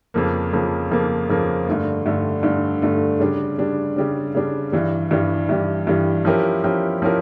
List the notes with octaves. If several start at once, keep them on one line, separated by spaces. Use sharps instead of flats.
F2 C#3 F3 A#3
F2 C#3 F3 A#3
F2 C#3 F3 A#3
F2 C#3 F3 A#3
G2 D3 A3
G2 D3 A3
G2 D3 A3
G2 D3 A3
C#3 G3 D4
C#3 G3 D4
C#3 G3 D4
C#3 G3 D4
G2 E3 G3
G2 E3 G3
G2 E3 G3
G2 E3 G3
F3 C#4 E4 G4 A#4
F3 C#4 E4 G4 A#4
F3 C#4 E4 G4 A#4